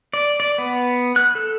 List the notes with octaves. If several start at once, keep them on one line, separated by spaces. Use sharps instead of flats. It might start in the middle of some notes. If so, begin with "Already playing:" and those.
D5
D5
B3
F#6
A4